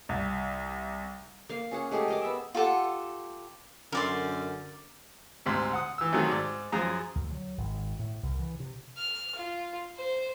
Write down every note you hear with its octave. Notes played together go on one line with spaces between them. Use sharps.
C2
A#3 F5
C#4 G#4 F#5
G#3 A3 G4 G#4
A#4 D#5 D6
B3 E5
F4 G4 A4 F#5
F#2 D3 A#4 D5 C6
D2 G#2 C3
F#5 D#6
E3 E6
C3 D#3 F#3 A3 F#4 G#4
G#2 D5
F#2 F3 G#4 A#5
D2
F#3
G#1
A2
C2
E3
C3
F6
F4
C5